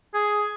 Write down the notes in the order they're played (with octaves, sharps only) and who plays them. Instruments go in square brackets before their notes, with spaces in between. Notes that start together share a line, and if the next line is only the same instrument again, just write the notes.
[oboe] G#4